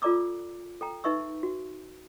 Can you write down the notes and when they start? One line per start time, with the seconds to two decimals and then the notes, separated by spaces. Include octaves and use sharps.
0.02 F4 A4 D5 A#5 D6 E6
0.81 A4 G5 A#5
1.04 D#4 B4 E5 C#6 E6
1.43 F#4